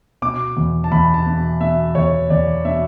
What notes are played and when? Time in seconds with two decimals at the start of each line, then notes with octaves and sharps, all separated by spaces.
0.22 B2 D6
0.57 E2
0.84 A5
0.91 E2 B5
1.14 A5
1.26 B2
1.61 B2 E5
1.95 E2 C#5
2.30 E2 D5
2.65 B2 E5